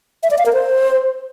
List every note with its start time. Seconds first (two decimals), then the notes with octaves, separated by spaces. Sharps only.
0.23 E5
0.31 D5
0.38 F5
0.46 A#4
0.53 C5